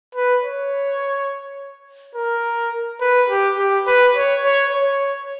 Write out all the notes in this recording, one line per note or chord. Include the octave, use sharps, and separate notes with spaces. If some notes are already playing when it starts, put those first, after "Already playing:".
B4
C#5
A#4
B4
G4
G4
B4
C#5
C#5
C#5